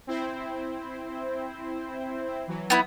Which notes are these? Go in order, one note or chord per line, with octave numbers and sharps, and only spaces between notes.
C4 E4 C5
E3 F#3
B3 E4